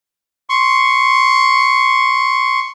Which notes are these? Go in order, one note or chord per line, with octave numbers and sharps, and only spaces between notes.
C6 C#6